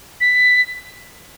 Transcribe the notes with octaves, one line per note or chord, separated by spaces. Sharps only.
B6